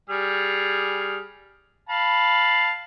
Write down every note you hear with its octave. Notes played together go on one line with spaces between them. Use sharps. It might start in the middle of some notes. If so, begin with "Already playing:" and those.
G3 G#4 F6
F5 A5 B5